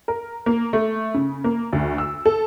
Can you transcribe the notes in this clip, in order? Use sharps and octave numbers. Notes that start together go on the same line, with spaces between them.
A#4
A#3
A3
C#3
A#3
D2
E6
A4